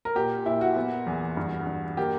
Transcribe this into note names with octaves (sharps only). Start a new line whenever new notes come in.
A#4
A#2 G4
A#2 E4
F#4
B3
E2
G2
G2
A#3 G4